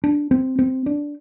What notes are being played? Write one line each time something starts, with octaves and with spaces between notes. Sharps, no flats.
D4
C4
C4
D4